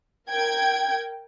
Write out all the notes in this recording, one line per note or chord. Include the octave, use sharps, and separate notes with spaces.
A#4 G5 G#6